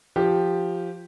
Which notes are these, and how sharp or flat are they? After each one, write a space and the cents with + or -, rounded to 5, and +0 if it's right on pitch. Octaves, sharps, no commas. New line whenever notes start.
F3 +0 G4 +0